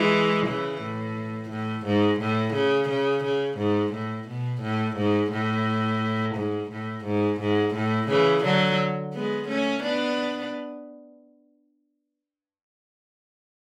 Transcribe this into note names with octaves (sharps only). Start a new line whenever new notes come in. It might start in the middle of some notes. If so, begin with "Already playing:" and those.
Already playing: E3 G#3
C#3 E3
A2
A2
G#2
A2
C#3
C#3
C#3
G#2
A2
B2
A2
G#2
A2
G#2
A2
G#2
G#2
A2
C#3 E3
D3 F#3
G#3 B3
A3 C#4
B3 D4